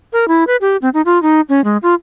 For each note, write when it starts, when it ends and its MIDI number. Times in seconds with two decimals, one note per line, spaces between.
0.13 0.27 70
0.28 0.44 64
0.47 0.56 71
0.61 0.77 67
0.82 0.89 60
0.94 1.01 63
1.06 1.21 65
1.23 1.41 63
1.49 1.63 61
1.64 1.77 56
1.83 1.95 65